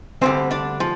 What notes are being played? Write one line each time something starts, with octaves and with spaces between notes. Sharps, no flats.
D2 D3 G3 C4 C5
D4 D5
F3